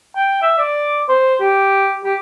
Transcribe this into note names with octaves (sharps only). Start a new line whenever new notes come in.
G5
E5
D5
C5
G4
G4